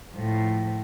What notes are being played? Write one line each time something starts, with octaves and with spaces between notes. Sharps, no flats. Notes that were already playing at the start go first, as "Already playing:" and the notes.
A2 F3